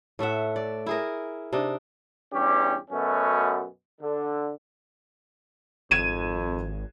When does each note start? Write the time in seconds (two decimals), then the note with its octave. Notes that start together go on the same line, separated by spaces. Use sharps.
0.19 A2 A3 E5 F#5
0.56 D5
0.86 E4 G#4 A#4
1.53 C3 D4 D#4 D5
2.33 E2 G2 C#4 G4
2.91 F#2 B2 A3 B3 C#4
4.00 D3
5.91 G#1 F2 G#6 D#7 E7